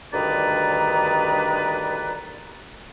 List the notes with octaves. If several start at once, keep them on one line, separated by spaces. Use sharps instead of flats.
D2 G2 D#3 B4 D5 A#5